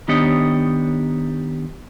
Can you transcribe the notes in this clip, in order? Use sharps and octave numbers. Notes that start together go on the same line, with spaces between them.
D#3 B3 D4 G4 C#5 D#5